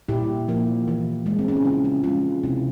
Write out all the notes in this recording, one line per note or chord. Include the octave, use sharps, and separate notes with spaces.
A#2 E4 G4
F3 A#3
E3
G#3
C4
C#4
E4
C#3 C#4 F4
C#4
F3 G#3 C#4 F4
C3 C4 E4